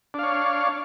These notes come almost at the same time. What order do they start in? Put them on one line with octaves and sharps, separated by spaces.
D4 F5 C#5